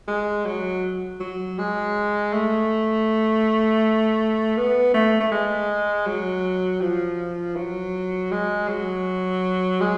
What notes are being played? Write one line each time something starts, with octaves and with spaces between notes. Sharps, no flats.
G#3
F#3
F#3
G#3
A3
B3
A3
A3
G#3
F#3
F3
F#3
G#3
F#3
G#3